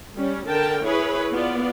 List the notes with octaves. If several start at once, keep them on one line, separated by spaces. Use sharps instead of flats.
G3 C#4
D3 A#4 G5 A5
E4 G#4 B4 C#5
B3 F4 D5